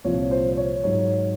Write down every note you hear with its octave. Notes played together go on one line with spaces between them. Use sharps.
C2 A#2 F3 C#5
C5
C5
C#5
G#2 F#3 C#5